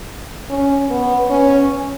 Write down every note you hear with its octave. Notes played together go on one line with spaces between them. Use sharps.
C#4
B3
C#4